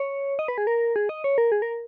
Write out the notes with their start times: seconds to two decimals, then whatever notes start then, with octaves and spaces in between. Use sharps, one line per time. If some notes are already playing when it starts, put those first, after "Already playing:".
Already playing: C#5
0.39 D#5
0.48 B4
0.58 G#4
0.67 A#4
0.96 G#4
1.09 D#5
1.24 C#5
1.38 A#4
1.52 G#4
1.62 A#4